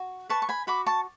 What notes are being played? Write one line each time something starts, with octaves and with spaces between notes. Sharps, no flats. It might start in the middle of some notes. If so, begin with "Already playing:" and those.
Already playing: F#4
B4 A5 C#6
C#6
G#5 B5
F#4 B5 D6
A5 C#6